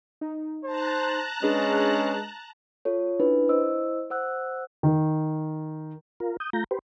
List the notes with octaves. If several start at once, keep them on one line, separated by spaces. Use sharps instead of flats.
D#4
C5 A5 A#5 F#6
G#3 C#4 D4 G#4 B4
F4 A4 C#5
C#4 D4 E4 B4
E4 C5 D#5 E6
C5 F#5 E6 F#6
D#3
F4 A#4
D#6 G6
A3 F4 A#5 G6 A#6
G4 B4 C5